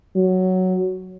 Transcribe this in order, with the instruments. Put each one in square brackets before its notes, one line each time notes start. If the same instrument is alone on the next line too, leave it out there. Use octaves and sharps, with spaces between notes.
[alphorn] F#3